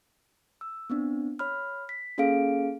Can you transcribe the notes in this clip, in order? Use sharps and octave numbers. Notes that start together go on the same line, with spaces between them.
E6
B3 C4 D4
C#5 B5 F6
B6
A#3 C#4 G#4 A4 F5 D7